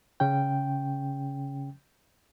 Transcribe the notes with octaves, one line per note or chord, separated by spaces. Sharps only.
C#3 C#4 G5